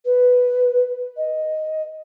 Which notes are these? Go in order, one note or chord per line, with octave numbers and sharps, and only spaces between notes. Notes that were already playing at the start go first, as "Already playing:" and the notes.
B4
D#5